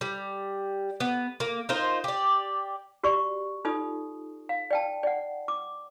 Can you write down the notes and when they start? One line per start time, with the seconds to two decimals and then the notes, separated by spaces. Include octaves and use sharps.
0.01 G3
1.00 B3
1.40 A#3
1.69 D#4 F4 A#4 C5
2.04 G4 D5
3.03 F#4 G4 D5 C#6
3.65 D#4 F4 A4 D#6
4.49 F5
4.71 D5 G5 A5
5.03 D5 F#5
5.48 D6